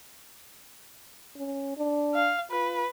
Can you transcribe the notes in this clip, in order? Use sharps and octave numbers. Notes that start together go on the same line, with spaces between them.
C#4
D4
F5
F4 B4